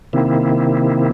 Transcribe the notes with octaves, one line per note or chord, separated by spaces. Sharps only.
C3 D#3 A#3 C4 E4